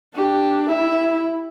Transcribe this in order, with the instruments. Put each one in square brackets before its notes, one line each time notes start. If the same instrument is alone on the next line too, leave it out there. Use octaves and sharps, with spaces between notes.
[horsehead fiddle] D4 [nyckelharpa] G4
[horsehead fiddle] E4 [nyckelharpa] E5